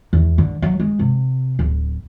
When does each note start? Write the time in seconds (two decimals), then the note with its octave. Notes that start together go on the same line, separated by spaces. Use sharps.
0.13 E2
0.38 D3
0.62 F#3
0.80 G#3
0.99 C3
1.59 D1